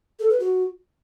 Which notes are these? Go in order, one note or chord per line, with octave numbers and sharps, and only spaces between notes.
A4
B4
F#4